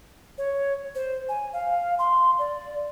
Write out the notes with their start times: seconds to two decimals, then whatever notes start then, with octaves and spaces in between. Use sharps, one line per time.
0.38 C#5
0.95 C5
1.29 G#5
1.53 F5
1.99 C6
2.39 D5